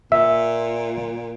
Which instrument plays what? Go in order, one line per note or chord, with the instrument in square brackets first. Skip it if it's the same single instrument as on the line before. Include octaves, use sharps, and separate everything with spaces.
[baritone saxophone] A#2 [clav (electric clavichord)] E5